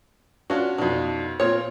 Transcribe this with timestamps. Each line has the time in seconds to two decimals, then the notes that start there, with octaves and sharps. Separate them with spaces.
0.50 C#4 D4 F4 F#4
0.78 F2 B2 D4 D#4
1.40 A#2 C4 F4 C#5